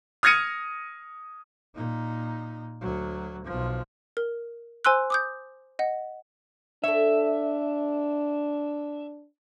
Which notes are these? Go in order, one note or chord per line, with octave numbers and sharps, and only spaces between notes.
D#6 F6 G#6 A#6 C#7 D#7
A#2 D#4
D2 F#3
B1 F3
A#4
C5 G#5 C6 E6 F#6
D6 D#6 G6
D#5 F#5
D4 A4 C#5 E5